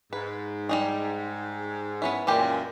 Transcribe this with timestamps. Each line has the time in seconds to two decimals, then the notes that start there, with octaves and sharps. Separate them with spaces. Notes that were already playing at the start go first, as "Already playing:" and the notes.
0.13 G#2 B4
0.69 G3 D#4 G#4
2.02 B3 C#4 E4
2.27 F#2 A#2 E3 G#3 G4